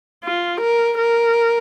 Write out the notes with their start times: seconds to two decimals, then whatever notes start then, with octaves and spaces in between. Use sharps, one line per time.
0.24 F4
0.61 A#4
0.98 A#4